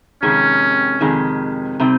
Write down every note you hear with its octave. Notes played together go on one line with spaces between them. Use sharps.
F2 C3 D#3 G#3 C#4
F2 C3 D#3 G#3
C3 G3 C4 D#4